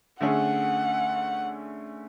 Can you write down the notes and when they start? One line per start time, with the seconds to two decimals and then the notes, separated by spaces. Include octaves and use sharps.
0.21 D3 A3 C#4 G#4 F#5